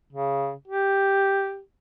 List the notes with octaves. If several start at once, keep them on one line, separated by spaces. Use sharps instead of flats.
C#3
G4